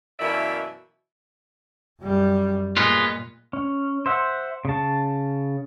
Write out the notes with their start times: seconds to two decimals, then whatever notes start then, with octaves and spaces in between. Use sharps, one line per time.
0.19 F#2 B2 E3 A#3 D5 E5
2.00 F#2 G3
2.77 A#2 G#3 B3 F4
3.53 C#4
4.06 C5 E5 F#5
4.65 C#3 A5